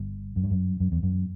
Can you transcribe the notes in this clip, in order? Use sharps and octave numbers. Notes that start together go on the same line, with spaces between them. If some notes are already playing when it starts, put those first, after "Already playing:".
Already playing: G1 G2
F#2
G2
F#2
F#2
E2
F#2